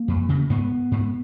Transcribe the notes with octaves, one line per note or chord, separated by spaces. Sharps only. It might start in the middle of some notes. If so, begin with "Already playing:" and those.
Already playing: A#3
F2
C#3
G#2 B3
G#2